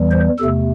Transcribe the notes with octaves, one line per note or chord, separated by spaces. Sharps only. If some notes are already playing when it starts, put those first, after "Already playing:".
Already playing: E2 E3 G3
C5
E2 C3 A3 A4